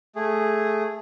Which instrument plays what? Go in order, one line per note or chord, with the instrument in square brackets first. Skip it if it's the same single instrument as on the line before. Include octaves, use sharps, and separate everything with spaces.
[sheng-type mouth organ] A3 G#4